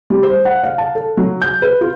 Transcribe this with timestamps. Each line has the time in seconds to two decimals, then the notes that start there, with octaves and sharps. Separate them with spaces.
0.10 G3
0.23 C5
0.45 F#5
0.63 F5
0.78 A5
0.95 A4
1.17 F#3
1.42 G6
1.62 B4
1.81 F4